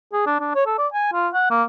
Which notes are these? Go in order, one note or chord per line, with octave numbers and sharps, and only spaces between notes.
G#4
D4
D4
C#5
A4
D5
G#5
F4
F#5
A#3